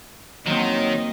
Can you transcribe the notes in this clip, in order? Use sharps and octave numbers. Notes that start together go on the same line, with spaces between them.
D#3 F#3 A#3 C4 D#5